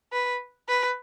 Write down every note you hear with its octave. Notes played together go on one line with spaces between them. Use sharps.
B4
B4